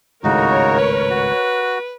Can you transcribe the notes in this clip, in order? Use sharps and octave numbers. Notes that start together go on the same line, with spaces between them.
G#1 C#2 A2 C#3 D#4 F#4 A#4 C#5
B4
F#4